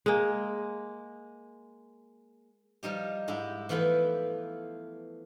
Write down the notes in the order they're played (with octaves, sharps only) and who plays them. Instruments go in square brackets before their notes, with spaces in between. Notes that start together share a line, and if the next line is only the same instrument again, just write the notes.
[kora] G#3 A#3
[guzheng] F3 G3 D#4 G4
G#2 E4 G4
E3 F3 A3 B3 B4